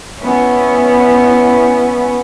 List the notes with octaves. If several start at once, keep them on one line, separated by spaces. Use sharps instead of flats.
B3 C#4 E4